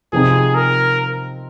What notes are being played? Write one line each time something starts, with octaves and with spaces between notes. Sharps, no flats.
C3 F3 C4 D#4 G#4
A#4